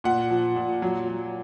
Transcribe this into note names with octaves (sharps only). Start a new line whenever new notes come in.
A#2 F#5
F3
A#2
F#3
F#3